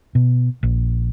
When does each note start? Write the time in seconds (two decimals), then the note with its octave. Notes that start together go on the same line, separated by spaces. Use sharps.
0.15 B2
0.63 A#1